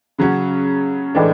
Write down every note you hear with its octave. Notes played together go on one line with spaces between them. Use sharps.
C#3 F#3 C#4 F#4
A2 E3 G#3 D4